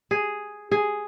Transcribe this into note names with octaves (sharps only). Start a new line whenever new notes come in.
G#4
G#4